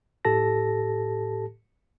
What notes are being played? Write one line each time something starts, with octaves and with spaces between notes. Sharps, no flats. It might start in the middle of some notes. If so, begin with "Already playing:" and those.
A2 G4 A4 A5 A#6